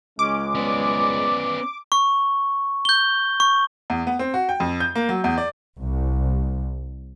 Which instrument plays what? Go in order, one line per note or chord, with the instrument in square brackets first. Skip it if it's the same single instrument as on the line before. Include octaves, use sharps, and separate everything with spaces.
[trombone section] C#2 G#3 [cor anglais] C#4 [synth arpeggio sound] D6
[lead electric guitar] B3 C#4 [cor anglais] D5
[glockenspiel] C#6
G6 G7
C#6
[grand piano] E2
B3
C4
F#4
G5
F2
G6
A#3
F#3
E2
D5
[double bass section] C2